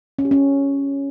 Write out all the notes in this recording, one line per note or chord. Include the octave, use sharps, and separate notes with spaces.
C#4
G4
C#4